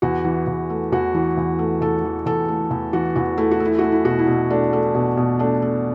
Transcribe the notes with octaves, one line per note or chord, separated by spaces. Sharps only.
E2 F#4
E3
E2
A3
E2 F#4
E3
E2
A3
E2 A4
E3
E2 A4
A3
E2
E3 F#4
E2 F#4
A3 E4
F#4
A3
E4
A3 F#4
E4
B2 F#4
E4
B2
A3 D4
A3
B2
B2
A3 D4
A3